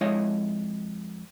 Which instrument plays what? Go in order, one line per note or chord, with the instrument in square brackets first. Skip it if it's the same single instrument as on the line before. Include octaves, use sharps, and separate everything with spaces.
[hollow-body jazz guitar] F2 G#3 E4 C#5 D#5 F5